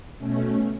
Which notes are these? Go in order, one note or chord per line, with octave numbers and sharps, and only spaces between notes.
B2 A3 C#4